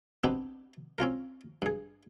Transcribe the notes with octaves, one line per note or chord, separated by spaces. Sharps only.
B3 C4 D4 D#4 G4
C4 C#4 F4 A#4
G2 G#4